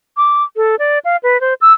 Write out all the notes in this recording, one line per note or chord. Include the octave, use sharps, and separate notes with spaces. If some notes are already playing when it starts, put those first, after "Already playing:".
D6
A4
D5
F5
B4
C5
E6